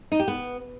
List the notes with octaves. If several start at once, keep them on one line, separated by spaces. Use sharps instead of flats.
D#4
G4
B3